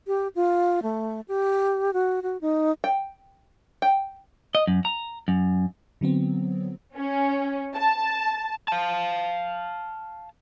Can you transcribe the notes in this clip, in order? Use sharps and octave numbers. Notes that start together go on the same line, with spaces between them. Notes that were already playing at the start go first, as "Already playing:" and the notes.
G4
F4
A3
G4
F#4
F#4
D#4
G5
G5
D#5
F#2
A#5
F#2
D3 F#3 B3 C4
C#4
A5
F5 A5